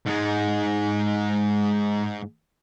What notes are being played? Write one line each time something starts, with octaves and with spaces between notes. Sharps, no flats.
G#2 G#3